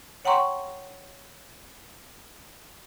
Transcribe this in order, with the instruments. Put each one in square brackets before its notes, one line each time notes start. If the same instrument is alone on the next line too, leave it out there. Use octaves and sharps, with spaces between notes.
[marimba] C#5 F#5 G5 A#5 C6 C#6